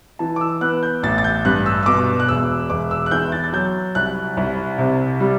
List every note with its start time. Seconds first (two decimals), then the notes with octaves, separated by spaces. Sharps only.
0.19 E3 A5
0.36 D6
0.41 E6
0.61 B3 F#6
0.83 G6
1.03 A1 A6
1.18 A6
1.24 G6
1.45 G2 F#6
1.66 E6
1.83 E6
1.86 B2 D6
2.20 F#6
2.28 E1 E6
2.70 E1 D6
2.91 E6
3.06 F#6
3.11 E2 G6
3.32 A6
3.44 A6
3.53 F#3 G6
3.95 C2 F#6
4.37 C2
4.78 C3
5.20 G3